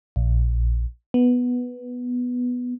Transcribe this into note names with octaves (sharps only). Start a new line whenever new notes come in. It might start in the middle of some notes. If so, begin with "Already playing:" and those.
A#1
B3